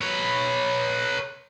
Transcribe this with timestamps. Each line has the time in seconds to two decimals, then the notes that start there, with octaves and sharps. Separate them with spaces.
0.01 B4 C#5